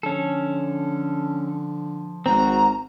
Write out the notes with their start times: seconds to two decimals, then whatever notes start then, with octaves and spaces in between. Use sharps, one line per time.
0.03 D3 F3 C#4 A4
2.26 G#1 C4 F#4 A#5